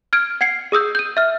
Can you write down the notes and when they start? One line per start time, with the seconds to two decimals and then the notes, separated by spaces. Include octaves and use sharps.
0.13 F6 G#6 D7
0.41 F#5 G#6 C7 C#7
0.72 G#4 D#6 E6 G6
0.95 G6 D#7
1.17 E5 F6